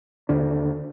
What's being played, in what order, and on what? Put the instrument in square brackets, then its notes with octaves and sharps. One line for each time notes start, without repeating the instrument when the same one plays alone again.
[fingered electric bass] D#2 D3 D4